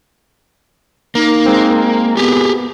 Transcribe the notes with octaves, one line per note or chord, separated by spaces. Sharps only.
A#3 D#4
G#3 C4
B3 G4 G#4